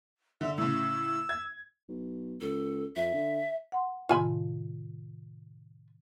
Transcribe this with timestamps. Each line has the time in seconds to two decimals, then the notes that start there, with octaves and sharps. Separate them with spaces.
0.41 D3 E5
0.58 A2 C#3 E6
1.29 G#6
1.89 B1
2.41 C#2 A4
2.96 F2 E5
3.13 D3
3.72 F#5 C6
4.09 A2 C3 D#3 F4 G#5 B5